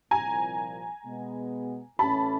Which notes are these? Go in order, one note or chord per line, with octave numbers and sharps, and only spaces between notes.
C2 A#2 F3 G#5 A#5
B2 G#3 B3
A1 A2 E3 A3 C#4 A5 B5